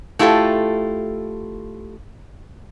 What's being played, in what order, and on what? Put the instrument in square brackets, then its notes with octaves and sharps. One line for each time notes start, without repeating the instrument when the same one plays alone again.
[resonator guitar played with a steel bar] A3 E4 F4 G4 A4